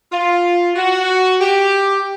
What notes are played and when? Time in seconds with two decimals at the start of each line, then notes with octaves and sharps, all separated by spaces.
0.11 F4
0.76 F#4
1.40 G4